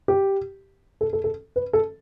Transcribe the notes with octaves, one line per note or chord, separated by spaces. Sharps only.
G4
A4
A4
A4
B4
A4